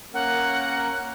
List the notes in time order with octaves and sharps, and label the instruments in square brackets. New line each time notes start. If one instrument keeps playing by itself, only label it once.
[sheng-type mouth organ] A#3 C#4 A#4 [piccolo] F#5